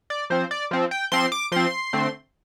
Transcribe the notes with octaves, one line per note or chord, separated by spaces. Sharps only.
D5
F3 C4 C5
D5
F3 C4
G5
F3 C4 C6
D6
F3 C4 C6
D3 A3 C4